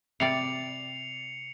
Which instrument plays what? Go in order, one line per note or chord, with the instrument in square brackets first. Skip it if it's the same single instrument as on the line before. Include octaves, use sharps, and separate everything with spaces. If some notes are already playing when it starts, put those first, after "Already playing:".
[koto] C3 G3 D5 [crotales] C7 C#7 F7